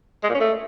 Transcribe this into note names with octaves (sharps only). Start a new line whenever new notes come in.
G#3
A#2
C#4
A3